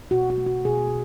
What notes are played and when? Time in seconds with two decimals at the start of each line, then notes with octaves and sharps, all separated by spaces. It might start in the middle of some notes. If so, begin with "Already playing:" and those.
0.11 B2 F#4
0.30 F#4
0.38 A3
0.46 F#4
0.65 B2 G#4